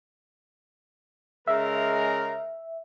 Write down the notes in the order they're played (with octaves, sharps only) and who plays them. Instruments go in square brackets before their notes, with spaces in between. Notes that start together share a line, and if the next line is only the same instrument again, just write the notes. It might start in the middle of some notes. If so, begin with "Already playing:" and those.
[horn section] C#3 G#3 A#4 [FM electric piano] E5